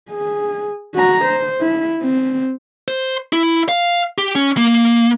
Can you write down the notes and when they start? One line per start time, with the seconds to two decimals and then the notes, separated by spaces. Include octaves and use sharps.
0.10 G#4
0.95 F#4 A#5
1.25 C5
1.61 E4
2.02 C4
2.88 C5
3.33 E4
3.69 F5
4.18 G4
4.35 C#4
4.57 A#3